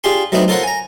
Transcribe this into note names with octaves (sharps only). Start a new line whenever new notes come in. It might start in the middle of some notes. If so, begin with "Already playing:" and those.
D4 F4 G4 G#4 C6
F#3 A3 B3 C4 D4 D#4
F4 A4 A#4 C5 C#5 F#5
G#5 A#5